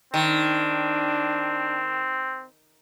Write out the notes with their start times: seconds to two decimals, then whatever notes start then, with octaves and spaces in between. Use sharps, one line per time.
0.14 D#3 C4 D4